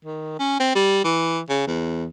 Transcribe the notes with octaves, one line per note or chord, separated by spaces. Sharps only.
D#3
C#4
C4
G3
E3
C#3
E2